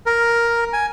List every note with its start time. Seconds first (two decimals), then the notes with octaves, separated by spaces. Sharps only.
0.06 A#4
0.73 G#5